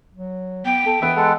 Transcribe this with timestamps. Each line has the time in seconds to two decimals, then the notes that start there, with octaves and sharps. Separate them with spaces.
0.14 F#3
0.65 B3 G5
0.86 A4
1.02 E3 B3 E5
1.16 G#3 A4 F#5